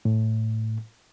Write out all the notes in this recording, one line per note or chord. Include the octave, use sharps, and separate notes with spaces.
A2